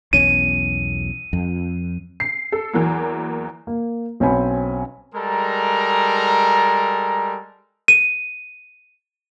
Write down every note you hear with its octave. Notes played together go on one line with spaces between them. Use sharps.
B1 E2 C#4 D#7
F2
C7
A4
E2 E3 F#3 A#3
A#3
B1 C4 C#4 B4 G#5 B5
G3 G#3 A4 A#4 A#5
D#7